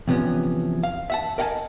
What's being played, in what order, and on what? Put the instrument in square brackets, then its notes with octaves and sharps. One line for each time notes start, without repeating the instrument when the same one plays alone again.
[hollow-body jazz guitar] E2 C3 F3 B3 C#4
F5
E5 F#5 A5
A#4 D#5 F5 F#5 G#5 A5